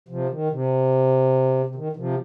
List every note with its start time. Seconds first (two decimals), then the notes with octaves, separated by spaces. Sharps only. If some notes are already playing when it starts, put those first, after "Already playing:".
0.08 C3 F3
0.29 D#3
0.51 C3
1.66 C3
1.75 D#3
1.92 D#3
1.96 C3 F3